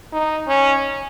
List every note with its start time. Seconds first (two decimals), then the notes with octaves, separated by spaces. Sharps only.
0.13 D#4
0.48 C#4